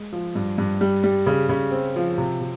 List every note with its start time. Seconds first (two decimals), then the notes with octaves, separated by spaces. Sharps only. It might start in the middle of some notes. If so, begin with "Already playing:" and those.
Already playing: G#3
0.12 F3
0.35 G2
0.58 G2
0.81 G3
1.04 G3
1.26 C#3
1.49 C#3
1.72 C4
1.96 F3
2.18 C3
2.41 C3